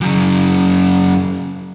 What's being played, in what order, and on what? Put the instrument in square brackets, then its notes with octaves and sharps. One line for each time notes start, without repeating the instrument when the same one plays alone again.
[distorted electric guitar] F#2 C#3